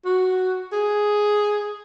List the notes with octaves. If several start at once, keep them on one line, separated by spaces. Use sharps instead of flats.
F#4
G#4